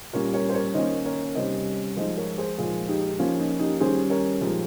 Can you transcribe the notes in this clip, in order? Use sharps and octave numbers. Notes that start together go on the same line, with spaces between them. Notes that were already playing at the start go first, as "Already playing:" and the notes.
A#2 G3 C#4 A#4 C#5
A#4 C#5
C5
A#4 C#5
D#3 A#3 C#4 C5 D#5
A#4 C#5
C3 G3 C#4 C5 D#5
F3 G#3 D#4 C5 D#5
A#4 C#5
G#4 C5
A#2 F3 G#3 F4 G#4
D#4 G4
F3 A#3 C#4 F4
D#4
D#4 G4
D#3 G3 C#4 G#4 C5
A#4 C#5
A#2 F3 G#3 G4 A#4